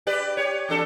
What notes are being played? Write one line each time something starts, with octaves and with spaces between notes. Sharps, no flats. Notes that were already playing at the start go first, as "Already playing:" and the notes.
G4 B4 D5
G4 C#5
E2 D4 A4